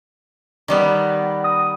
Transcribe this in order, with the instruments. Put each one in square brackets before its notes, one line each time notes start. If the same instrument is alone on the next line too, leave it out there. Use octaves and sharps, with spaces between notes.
[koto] D#3 G3 B3
[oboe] D#6